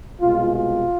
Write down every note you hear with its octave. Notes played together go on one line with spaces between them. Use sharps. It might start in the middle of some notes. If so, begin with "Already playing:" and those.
C2 B2 G#3 F4
F4